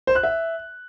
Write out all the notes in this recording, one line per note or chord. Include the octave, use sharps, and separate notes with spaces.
C5
F#6
E5